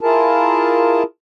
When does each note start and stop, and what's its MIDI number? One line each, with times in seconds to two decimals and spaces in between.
0.01 1.03 64
0.01 1.03 65
0.01 1.03 68
0.01 1.03 70
0.01 1.03 81